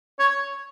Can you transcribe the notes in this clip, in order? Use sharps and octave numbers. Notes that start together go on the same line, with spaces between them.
C#5